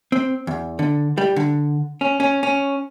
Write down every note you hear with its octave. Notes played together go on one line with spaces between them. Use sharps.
C4
E2
D3
G3
D3
C#4
C#4
C#4